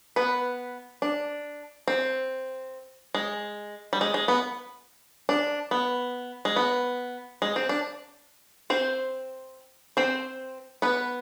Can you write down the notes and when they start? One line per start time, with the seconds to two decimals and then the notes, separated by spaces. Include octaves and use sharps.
0.16 B3 B4
1.02 D4
1.88 C4
3.15 G#3
3.93 G3
4.01 G#3
4.14 G#3
4.28 B3
5.29 D4
5.71 B3
6.45 G#3
6.56 B3
7.42 G#3
7.56 C4
7.69 D4
8.70 C4 C5
9.97 C4 C5
10.82 B3 B4